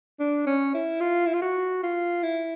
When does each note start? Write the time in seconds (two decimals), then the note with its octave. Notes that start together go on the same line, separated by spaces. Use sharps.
0.20 D4
0.47 C#4
0.74 E4
1.01 F4
1.27 E4
1.34 F4
1.42 F#4
1.83 F4
2.23 E4